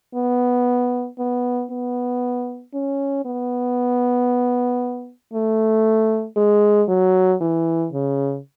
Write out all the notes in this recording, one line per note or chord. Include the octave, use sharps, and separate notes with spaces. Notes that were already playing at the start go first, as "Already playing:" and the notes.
B3
B3
B3
C#4
B3
A3
G#3
F#3
E3
C#3